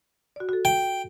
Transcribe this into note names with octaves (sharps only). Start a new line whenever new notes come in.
F#4 D5
F#4 A4
G5